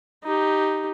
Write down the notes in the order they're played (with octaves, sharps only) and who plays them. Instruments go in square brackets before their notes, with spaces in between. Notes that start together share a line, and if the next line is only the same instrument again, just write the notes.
[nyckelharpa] D#4 G4